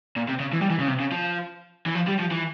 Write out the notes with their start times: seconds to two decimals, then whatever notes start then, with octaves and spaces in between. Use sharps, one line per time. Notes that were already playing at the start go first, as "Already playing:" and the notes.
0.17 A#2
0.28 C3
0.40 C#3
0.53 E3
0.61 G3
0.70 E3
0.79 C#3
0.88 C3
1.00 C#3
1.12 F3
1.86 E3
1.95 F3
2.07 G3
2.19 F3
2.31 E3